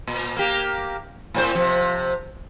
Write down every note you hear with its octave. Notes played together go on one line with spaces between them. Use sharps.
A#2
A#3 G4
A2 C4 C5
C3 F3